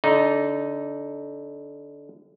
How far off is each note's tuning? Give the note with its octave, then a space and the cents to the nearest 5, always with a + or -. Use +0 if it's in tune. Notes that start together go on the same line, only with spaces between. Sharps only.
D3 -25 D#4 +0